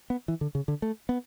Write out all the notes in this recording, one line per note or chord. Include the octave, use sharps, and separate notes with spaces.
B3
E3
D3
C#3
D3
A3
B3